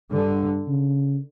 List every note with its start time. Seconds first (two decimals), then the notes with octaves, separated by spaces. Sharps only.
0.11 G2 D3
0.68 C#3